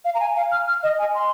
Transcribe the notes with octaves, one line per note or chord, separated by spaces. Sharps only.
F5
A#5
G#5
F5
F6
F6
D#5
G#5
C6